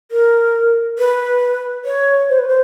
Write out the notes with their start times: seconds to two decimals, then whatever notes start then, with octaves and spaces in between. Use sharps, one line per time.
0.12 A#4
0.99 B4
1.85 C#5
2.29 C5
2.39 B4
2.48 C5